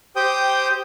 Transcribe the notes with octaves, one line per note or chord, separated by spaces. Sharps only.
G4 C5 G5 D#6